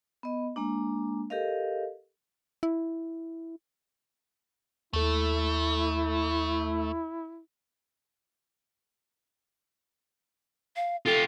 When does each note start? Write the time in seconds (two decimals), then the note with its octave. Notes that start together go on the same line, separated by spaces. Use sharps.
0.23 B3 D#5
0.56 G#3 A#3 D4
1.30 G4 A4 A#4 D#5 F5
2.63 E4
4.93 D#2 A3 E4 A4
10.76 F5
11.06 F4 G4 A4